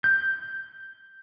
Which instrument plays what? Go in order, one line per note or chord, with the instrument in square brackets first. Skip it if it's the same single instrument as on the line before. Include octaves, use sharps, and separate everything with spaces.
[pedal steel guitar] G6